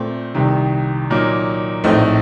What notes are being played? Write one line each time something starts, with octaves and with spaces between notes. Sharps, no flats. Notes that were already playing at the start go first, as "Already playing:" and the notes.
Already playing: A#2 A3 C4
C2 C3 D#3
A#2 F#3 A#3 D#4
A#1 A2 A3 C4 D#4